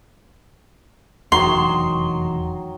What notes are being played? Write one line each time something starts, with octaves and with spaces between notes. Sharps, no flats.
F1 E2 D#3 F#3 C6